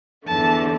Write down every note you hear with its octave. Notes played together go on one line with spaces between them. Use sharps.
E2 D3 A3 A5